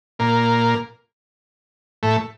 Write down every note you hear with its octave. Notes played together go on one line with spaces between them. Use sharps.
A#2 A#3
A2 A3